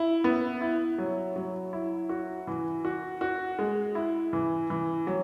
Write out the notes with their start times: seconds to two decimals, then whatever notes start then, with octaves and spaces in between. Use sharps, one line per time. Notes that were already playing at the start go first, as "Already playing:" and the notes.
Already playing: E4
0.24 B3
0.61 E4
0.98 F#3
1.36 F#3
1.73 E4
2.09 F#4
2.47 E3
2.85 F#4
3.21 F#4
3.59 G#3
3.95 E4
4.33 E3
4.70 E3
5.07 F#3